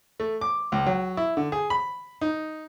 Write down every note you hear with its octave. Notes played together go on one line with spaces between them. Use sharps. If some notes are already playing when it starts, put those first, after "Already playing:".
A3
D6
C#2
F#3
E4
D3
G#4
B5
D#4